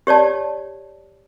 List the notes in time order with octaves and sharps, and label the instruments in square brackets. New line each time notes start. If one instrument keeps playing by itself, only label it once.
[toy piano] G4 C#5 D5 A5